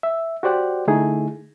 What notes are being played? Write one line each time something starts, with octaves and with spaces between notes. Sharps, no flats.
E5
F#4 G4 C5 D5 F#5 G5
D3 A3 D#4 E4 G#4